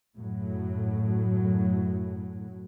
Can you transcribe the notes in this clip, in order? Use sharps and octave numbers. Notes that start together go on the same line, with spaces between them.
F#2 A2 F#3